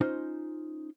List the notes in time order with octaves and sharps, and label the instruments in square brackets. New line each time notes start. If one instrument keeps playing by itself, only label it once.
[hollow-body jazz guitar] C#4 D#4 F4 C5